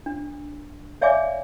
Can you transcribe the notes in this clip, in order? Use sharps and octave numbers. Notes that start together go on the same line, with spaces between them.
D4
C#5 D5 E5 F5 G#5 D6